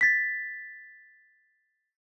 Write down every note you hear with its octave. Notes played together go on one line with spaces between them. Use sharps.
A6 B6